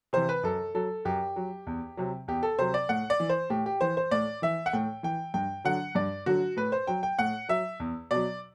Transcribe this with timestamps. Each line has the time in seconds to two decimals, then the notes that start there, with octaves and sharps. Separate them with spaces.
0.13 C3 E3 C5
0.29 B4
0.43 F#2 A4
0.75 F#3 A4
1.05 F#2 G4
1.36 F#3
1.67 E2
1.97 C3 F#3
2.28 E2 G4
2.43 A4
2.59 C3 F#3 C5
2.74 D5
2.89 A2 F#5
3.10 D5
3.20 E3
3.29 C5
3.50 A2 G4
3.66 G4
3.81 E3 C5
3.97 C5
4.11 A2 D5
4.42 E3 E5
4.66 F#5
4.73 A2 G5
5.03 E3 G5
5.34 G2 G5
5.65 D3 F#3 F#5
5.95 G2 D5
6.26 D3 F#3 F#4
6.57 A2 B4
6.72 C5
6.87 F#3 G5
7.03 G5
7.19 A2 F#5
7.49 F#3 E5
7.80 E2
8.11 B2 F#3 D5